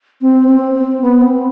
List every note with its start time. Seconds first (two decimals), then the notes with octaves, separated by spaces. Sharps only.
0.21 C4
0.48 C4
0.74 C4
1.01 B3
1.21 C4